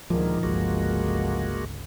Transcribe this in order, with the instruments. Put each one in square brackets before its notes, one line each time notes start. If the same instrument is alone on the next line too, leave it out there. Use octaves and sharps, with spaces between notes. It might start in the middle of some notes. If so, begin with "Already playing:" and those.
[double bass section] D2 A#2 D#3 [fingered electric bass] F3 [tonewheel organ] G#3 A#3
[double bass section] G1 C#2 [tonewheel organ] G#3 A#3 F#4